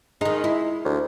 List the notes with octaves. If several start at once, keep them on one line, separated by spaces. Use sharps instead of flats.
D#3 G#3 D#4
E4
D2